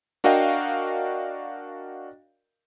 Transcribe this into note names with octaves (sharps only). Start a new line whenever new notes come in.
D4 F#4 A#4 D#5 F5 G5